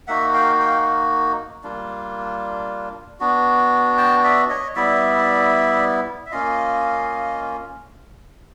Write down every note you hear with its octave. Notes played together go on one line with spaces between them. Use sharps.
A#3 D#4 F#4 E5 F#5
F5 G5
F5 G5
G3 A#3 D4 F4
B3 D4 F#4
G5 A5
D5 E5
C#5 D#5
G3 B3 E4 D5 E5
E5
A#3 C#4 F4 D#5 F5